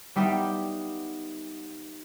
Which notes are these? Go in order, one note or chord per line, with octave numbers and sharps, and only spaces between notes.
G3 B3 D#4 G4 E5 G5